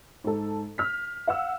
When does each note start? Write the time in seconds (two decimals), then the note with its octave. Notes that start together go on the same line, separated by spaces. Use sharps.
0.24 G#2 A4
0.78 F6 B6
1.27 F5 F#5 E6